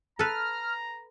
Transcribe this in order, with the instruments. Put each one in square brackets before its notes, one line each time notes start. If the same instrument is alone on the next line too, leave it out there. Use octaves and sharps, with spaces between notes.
[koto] A4 B4 [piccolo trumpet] A#5 [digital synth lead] F6